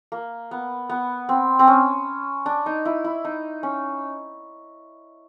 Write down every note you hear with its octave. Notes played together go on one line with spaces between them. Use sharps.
A#3
B3
B3
C4
C4
C#4
D4
D#4
E4
E4
D#4
C#4